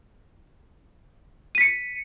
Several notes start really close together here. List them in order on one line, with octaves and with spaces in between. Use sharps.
D#7 B6 C#7